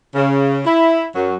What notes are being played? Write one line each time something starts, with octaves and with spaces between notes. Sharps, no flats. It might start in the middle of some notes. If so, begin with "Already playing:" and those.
C#3
E4
F#2 F#3